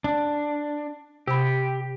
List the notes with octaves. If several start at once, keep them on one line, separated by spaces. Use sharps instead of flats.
D4
C3 G4 B5